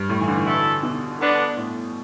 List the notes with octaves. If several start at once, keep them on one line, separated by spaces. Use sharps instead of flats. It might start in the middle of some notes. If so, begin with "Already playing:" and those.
Already playing: G2
A2
E3
D3
B2 D3 A3 E4 A4
B2
D3 B3 D4
A2